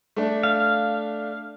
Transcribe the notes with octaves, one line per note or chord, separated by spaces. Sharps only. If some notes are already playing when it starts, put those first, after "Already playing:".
A3 D4
F5